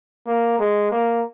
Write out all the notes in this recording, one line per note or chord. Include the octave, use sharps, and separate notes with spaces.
A#3
G#3
A#3